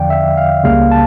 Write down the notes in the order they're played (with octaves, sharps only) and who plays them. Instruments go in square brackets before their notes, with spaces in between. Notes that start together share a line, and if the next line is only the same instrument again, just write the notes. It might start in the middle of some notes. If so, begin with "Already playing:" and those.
Already playing: [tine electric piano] E2 D3 F3 D5 F5 G5
E5
F5
C#2 C#3 G3 A#3 F5
A5